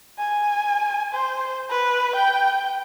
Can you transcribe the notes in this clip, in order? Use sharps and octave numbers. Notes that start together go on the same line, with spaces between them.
G#5
C5
B4
G5